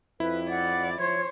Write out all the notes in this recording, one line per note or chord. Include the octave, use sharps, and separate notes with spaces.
F2 E4 B4
D5 F#5
F3 C5 C#5 G#6